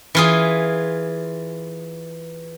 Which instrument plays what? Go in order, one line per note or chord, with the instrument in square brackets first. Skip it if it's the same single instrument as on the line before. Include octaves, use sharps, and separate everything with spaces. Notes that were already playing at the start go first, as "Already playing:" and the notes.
[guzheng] E3 F4 G#4